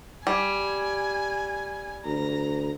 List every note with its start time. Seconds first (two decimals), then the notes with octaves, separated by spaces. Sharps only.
0.27 G3 G#5
2.06 D2 A#5